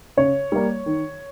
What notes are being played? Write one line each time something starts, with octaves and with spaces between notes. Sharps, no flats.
C#3 C#5
G3 A#3
D#3